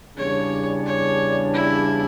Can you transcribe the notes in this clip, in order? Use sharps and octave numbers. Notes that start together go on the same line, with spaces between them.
E2 C#3 G3 D4 C#5
C#5
E4